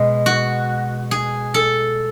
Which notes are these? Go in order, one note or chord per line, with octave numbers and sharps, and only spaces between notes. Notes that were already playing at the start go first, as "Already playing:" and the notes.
Already playing: B2 G#3
F#4
G#4
A4